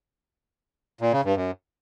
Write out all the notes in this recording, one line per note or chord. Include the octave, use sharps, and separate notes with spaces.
A#2
C#3
G2
F#2